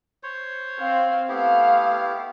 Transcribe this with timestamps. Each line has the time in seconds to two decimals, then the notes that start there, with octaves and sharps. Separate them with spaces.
0.23 C5 C#5
0.78 C4 F5
1.29 A3 B3 E4 G4 F5